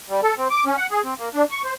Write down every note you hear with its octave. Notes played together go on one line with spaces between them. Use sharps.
G3
A4
C4
D6
C#4
F#5
G#4
C4
A#3
D4
C#6
C5